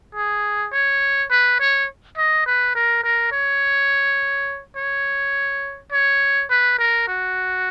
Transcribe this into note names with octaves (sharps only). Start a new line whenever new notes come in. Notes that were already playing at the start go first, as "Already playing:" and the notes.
G#4
C#5
B4
C#5
D#5
B4
A#4
A#4
C#5
C#5
C#5
B4
A#4
F#4